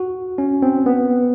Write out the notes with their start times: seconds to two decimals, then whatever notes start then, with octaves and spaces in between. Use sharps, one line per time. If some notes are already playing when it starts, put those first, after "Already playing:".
Already playing: F#4
0.38 C#4
0.62 C4
0.86 B3